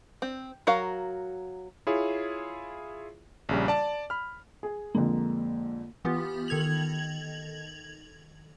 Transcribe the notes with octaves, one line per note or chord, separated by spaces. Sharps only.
C4
F#3 F#4 A#4 F5
E4 F4 G#4 C#5
A#1 C#3 G3
D5 A5
B5 F6
G#4
F2 D3 G#3 A#3
E3 B3 F4 G4
D#3 A4 G#6 F7 F#7